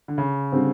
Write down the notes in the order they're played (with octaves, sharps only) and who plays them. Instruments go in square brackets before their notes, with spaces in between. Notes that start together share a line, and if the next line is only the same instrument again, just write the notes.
[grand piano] D3
C#3
[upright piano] D3 G3 C4